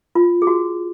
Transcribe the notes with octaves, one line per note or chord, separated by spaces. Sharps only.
F4
G#4
F#4